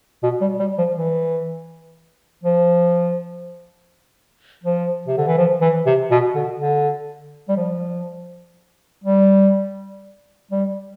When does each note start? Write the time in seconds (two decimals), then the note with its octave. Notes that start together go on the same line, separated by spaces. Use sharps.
0.23 B2
0.41 G3
0.59 G3
0.78 F3
0.96 E3
2.44 F3
4.64 F3
5.08 C3
5.17 D3
5.27 E3
5.37 F3
5.61 E3
5.86 C3
6.11 B2
6.35 D3
6.60 D3
7.49 G3
7.57 F3
9.04 G3
10.52 G3